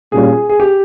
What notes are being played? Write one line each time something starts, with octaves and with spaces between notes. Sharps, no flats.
A#2 G3 A#3 C#4 F4 G#4
G#4
G4